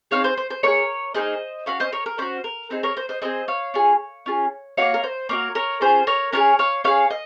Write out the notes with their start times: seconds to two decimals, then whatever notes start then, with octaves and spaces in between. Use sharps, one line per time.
0.11 C4 D#4 G#4 C#5 F5
0.24 C5
0.37 C5
0.50 C5
0.63 A#3 D#4 G#4 A#4 C#5
1.15 A#3 D#4 G#4 C5 D#5
1.66 C#4 F#4 C#5 F5
1.80 C5 D#5
1.92 A#4 C#5
2.06 A#4
2.18 C#4 F#4 C5
2.44 A#4
2.70 C4 D#4 G#4 C5
2.83 A#4 C#5
2.97 C5
3.09 C5 D#5
3.22 C4 D#4 G#4 C5 D#5
3.48 C#5 F5
3.74 C#4 F4 G#4
4.26 C#4 F4 G#4
4.77 A#3 D#4 F#4 C#5 F5
4.94 A#4
5.04 C5
5.29 A#3 D#4 F#4 A#4 C#5
5.55 A#4 C#5
5.81 C#4 F4 G#4 C5
6.07 A#4 C#5
6.33 C#4 F4 G#4 A#4 C#5
6.59 C#5 F5
6.84 C#4 G#4 C#5 F5
7.10 D#5